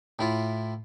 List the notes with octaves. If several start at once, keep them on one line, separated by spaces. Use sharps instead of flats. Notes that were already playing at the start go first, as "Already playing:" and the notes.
A2 E4 F4